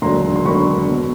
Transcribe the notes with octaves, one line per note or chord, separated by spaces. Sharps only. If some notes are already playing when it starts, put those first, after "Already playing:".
E1 D#2 D3 F#3 A#5 C6
C6
E1 D#2 D3 F#3 B5 C#6
B2 F#3